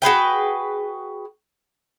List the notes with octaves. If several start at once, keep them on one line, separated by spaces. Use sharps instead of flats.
F#4 G#4 B4 G5